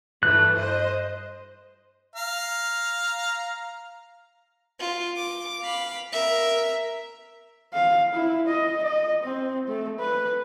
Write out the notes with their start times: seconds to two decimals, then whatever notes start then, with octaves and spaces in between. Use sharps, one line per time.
0.23 G2 E3 A3 F#6
0.56 C5 D#5
2.16 F5 A#5
4.79 F4
5.16 D6
5.61 F5 B5
6.13 A#4 E5
7.74 F5
8.14 E4
8.48 D#5
8.83 D#5
9.23 C4
9.68 A3
9.99 B4